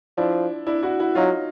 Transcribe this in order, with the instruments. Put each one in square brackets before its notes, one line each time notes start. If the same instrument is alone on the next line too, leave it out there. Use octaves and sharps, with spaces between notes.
[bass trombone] F3 [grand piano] D4 E4
[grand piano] D4 E4
E4 F#4
E4 F#4
[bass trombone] F#3 [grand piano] D#4 F4